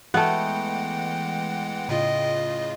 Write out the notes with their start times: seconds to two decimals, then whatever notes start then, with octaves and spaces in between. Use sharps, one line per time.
0.14 E3 G#3 A3 B3 F#5 G5
1.89 A2 C#3 F4 D#5